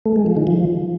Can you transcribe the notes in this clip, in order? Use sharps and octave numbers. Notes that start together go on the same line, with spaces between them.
A3
G#3
F3
D#3
F3